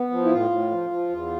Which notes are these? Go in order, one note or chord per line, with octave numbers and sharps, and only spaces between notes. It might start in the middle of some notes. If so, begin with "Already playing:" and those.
Already playing: B3
F3
E4
A2 F4
A2
F3
F3
E2